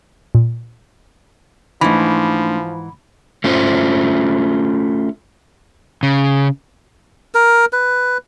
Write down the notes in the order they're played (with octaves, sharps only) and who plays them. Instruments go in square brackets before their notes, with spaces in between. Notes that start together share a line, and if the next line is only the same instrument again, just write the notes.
[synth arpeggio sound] A#2
[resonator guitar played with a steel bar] G#2 E3 [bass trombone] F3 [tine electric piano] A3 D4 D#4 [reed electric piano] B5
[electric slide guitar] A3 C#4 F4 C5
C#3
[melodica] A#4
B4